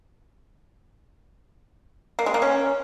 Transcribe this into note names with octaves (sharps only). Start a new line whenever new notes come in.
A#3
G#3
A#3
C#4